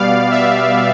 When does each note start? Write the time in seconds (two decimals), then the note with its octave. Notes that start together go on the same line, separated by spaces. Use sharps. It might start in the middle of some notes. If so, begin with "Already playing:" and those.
Already playing: B2 G3 B3 D5 F5
0.32 E5